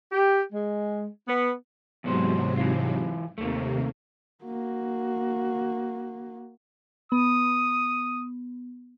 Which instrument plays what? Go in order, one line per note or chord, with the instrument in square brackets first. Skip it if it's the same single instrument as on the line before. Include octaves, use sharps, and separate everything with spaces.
[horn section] G4
G#3
B3
[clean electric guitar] E2 B3 C5 [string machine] G#2 C3 F#3
[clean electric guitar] E3 F4
[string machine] D#2 C3 [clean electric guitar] A3 A#3
[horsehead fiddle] A#3 F#4
[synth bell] B3 [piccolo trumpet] D#6